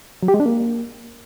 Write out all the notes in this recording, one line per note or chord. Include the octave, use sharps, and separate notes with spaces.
F#3
G4
G#3
D4
A#3